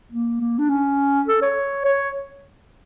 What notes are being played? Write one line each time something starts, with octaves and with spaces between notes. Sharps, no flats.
A#3
A#3
D4
C#4
A4
C#5
C#5